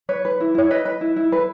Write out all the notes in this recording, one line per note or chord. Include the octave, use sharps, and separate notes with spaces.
B4 C#5
B4
E4
E4 C#5
B4 D#5
B4
E4
E4
B4